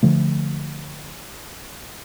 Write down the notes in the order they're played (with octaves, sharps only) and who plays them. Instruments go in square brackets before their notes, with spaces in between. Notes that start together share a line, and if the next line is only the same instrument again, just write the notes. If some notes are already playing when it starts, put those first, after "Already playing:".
[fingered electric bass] D3 F3 A3